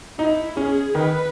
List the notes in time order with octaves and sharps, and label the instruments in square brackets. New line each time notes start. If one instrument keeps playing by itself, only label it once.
[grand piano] D#4 [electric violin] E4
[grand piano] C#4 [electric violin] G#4
[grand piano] D#3 [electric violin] B4